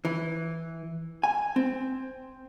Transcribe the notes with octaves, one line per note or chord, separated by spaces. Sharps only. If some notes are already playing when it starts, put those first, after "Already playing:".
E3
G#5
C4